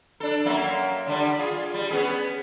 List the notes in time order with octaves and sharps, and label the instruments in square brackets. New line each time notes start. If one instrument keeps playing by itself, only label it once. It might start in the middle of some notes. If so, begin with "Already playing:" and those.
[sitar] D4 A4
F#2 A#3 E5
D3 G3 D4
F4 G#4
G3
B3 C#4 G#4